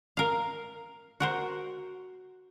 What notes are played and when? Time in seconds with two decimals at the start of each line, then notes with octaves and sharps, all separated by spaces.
0.17 A#4 F5
1.20 F#4 A#4 C5